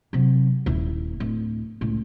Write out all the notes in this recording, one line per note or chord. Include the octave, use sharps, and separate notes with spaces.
C3 F#3
D#1 E4
D1
C#2 A2